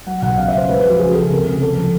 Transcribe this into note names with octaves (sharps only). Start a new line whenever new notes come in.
F#3 F#5
B1 F#5
C#3 F5
E5
C#3 C5
G#3 B4
B4
F3 F#4
C#3 G#4
C#2 A4
C3 A#4
C#2
F3 A4
F3